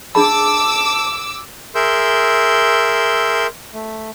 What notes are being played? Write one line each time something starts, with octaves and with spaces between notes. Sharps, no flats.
D4 G#4 A5 B5 D6 E6
G#4 A#4 E5 C6 E6 G6
A3